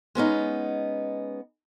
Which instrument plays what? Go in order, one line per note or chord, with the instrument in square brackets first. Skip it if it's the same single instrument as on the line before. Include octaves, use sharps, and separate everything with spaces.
[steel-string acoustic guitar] G#3 B3 C#4 D#4